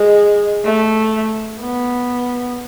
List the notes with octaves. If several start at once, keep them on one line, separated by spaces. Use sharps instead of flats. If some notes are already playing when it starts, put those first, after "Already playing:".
Already playing: G#3
A3
B3